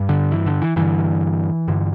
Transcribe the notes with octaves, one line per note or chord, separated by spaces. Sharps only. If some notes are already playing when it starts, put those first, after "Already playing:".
Already playing: G2
D3
E3
D3
E3
G2 D3 E3
G2 D3